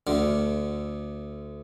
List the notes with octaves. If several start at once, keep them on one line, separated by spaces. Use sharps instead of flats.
D2 D3